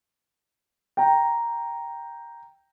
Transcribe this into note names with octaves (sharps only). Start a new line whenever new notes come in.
G5 A#5